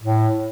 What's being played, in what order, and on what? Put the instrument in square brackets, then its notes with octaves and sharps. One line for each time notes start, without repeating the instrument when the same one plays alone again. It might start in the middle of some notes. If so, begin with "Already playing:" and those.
[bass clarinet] A2